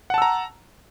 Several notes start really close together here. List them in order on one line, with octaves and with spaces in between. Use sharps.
F#5 A5 E6 A#5